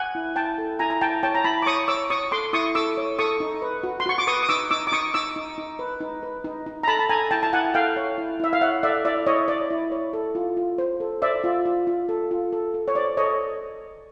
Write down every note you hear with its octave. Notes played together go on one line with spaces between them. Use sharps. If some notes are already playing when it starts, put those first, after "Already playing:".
Already playing: F#5 G#5
E4
E4 G5 A5
A4
E4 G#5 A#5
A#5
E4 G5 A5
C#5 G5 A5
A#5
E4 A5 B5
D6
C#5 C#6 D#6
C#5 D6 E6
C#5 C#6 D#6
A4 C6 D6
E4 C#6 D#6
A4 D6 E6
C#5
A4 C#6 D#6
D#4
B4
F#4
C6
F#4 C#6
D6
B4 C#6 D#6
D#6
D#4 D6 E6
D#4 D6 E6
D6
D#4 C#6 D#6
D#4 D6 E6
D#4
D#4
B4
D#4
B4
D#4
D#4
A#5
A4 A5 B5
A5
A4 G#5 A#5
E4 G5 A5
A5
E4 F#5 G#5
A4 F5 G5
C#5
E4
E4 E5
F5
C#5 E5 F#5
A4 D5 E5
E4 D5 E5
E4 C#5 D#5
C#5 D5
E4
C#5
A4
F4
F4
C5
A4
C5 D5 E5
F4
F4
F4
A4
F4
A4
A4
C#5
C5 D5
A4 C#5 D#5